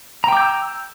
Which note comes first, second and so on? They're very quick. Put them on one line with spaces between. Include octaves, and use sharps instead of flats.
A#5 G5 D6 G6 E6